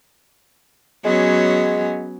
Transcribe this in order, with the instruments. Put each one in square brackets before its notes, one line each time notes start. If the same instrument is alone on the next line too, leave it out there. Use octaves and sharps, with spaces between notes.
[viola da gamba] F#3 B3 C#4 [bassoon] G#3